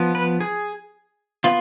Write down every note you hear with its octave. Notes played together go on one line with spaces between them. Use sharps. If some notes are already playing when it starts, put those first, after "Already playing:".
Already playing: F3 B3
B4
G#4
B3 F4